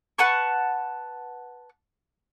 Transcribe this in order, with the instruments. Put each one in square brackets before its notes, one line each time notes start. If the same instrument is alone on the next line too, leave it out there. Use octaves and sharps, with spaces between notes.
[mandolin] B4 F#5 A5 C#6